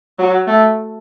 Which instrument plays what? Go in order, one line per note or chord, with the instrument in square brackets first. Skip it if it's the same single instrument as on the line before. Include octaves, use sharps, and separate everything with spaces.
[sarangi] F#3
A3